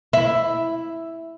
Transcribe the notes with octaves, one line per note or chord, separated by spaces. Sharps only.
E4